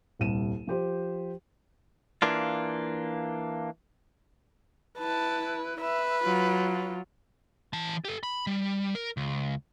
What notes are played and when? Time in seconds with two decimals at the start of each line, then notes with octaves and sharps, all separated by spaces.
0.19 D#1 C2 D#7 E7
0.67 F3 G4 C5
2.22 E3 A#3 D4 F4
4.99 E4 B4 A5
5.81 B4 E5
6.24 F#3 F4
7.73 E3 A5
8.05 G4 A4
8.23 B5
8.47 G3
8.95 A#4
9.17 C#2